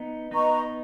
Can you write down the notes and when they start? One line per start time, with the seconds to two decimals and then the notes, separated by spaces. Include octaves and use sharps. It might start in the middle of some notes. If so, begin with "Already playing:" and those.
Already playing: B3 D#4
0.31 B3 D#4 B4 D#5 A#5 C#6